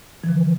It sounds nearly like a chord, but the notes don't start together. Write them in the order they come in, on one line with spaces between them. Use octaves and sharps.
E3 F3 D3